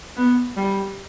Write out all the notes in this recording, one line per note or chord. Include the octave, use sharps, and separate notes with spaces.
B3
G3